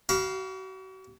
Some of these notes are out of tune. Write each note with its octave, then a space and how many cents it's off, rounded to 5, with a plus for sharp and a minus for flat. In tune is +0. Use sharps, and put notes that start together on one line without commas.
F#4 +40 F5 +0 B5 -25